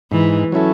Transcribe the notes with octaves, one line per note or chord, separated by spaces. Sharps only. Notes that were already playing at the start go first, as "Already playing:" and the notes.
G#2 E3
F#3 C#4 E4 A4